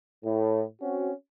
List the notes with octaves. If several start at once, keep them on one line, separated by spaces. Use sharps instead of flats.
A2
C4 C#4 F#4